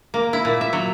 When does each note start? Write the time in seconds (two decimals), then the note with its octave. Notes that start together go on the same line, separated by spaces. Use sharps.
0.14 A#3
0.33 E4
0.45 A#2
0.61 E5
0.73 F#3